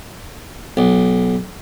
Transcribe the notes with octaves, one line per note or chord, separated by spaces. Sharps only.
B1